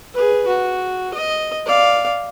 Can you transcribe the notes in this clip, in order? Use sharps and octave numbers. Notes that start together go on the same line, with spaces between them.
G#4 B4
F#4
D#5
D5 F5